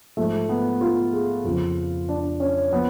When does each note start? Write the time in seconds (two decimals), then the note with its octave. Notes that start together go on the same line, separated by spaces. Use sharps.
0.17 G#2 F3 A3
0.49 B3
0.81 F4
1.13 G#4
1.44 F2 C#3 F3 F4
2.09 D4
2.40 C#4
2.71 F3 B3